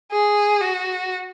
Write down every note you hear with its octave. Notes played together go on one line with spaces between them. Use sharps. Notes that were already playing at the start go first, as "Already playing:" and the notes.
G#4
F#4